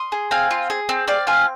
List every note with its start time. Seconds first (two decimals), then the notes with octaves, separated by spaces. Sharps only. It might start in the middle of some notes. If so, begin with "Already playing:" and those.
Already playing: C6 D#6
0.12 G#4
0.31 C4 F5 G#5
0.51 F4
0.70 G#4
0.89 C4
1.08 C4 D5 F5
1.27 F4 F5 G#5